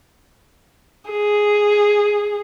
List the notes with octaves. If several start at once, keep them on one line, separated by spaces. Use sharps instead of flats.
G#4